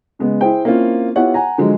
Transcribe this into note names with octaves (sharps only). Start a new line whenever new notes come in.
C#3 G#3 B3
E4 G#4 C5 G5
A#3 C4 C#4 E4 F4
B3 E4 F4 G4 C#5 F#5
F#5 G#5 A#5
D3 F3 F#3 G#3